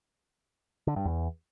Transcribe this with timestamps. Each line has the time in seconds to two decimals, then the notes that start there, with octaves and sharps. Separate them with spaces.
0.87 D3
0.96 G2
1.05 E2